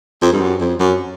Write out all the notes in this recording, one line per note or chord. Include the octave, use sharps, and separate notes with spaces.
F2
G2
F#2
F2
F#2